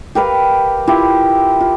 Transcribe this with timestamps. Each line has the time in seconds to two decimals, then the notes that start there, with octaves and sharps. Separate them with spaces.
0.15 G4 A#4 B4 F5
0.87 E4 F4 G4
1.60 F4